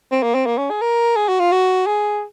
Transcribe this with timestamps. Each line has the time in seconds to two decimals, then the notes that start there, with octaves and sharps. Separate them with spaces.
0.12 C4
0.23 A#3
0.35 C4
0.46 A#3
0.58 C#4
0.70 G#4
0.82 A#4
1.16 G#4
1.29 F#4
1.40 F4
1.52 F#4
1.87 G#4